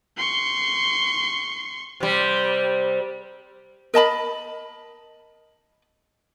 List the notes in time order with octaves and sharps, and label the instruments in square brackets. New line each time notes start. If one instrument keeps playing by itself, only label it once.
[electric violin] C6 C#6
[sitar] C3 G3
[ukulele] A#4 D#5 A5 B5